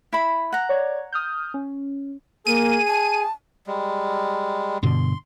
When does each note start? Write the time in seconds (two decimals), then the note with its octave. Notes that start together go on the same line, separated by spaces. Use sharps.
0.13 E4 B5
0.52 F#5 A#5
0.69 C#5 D5 G#6
1.12 D#6 F6 G6
1.54 C#4
2.47 A#3 G#4 D#7
2.87 A5
3.67 G3 G#3
4.83 G2 B2 D3 C6